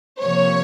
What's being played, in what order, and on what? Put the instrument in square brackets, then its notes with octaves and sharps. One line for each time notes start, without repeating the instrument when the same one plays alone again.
[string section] C3 F3 A#3 C#5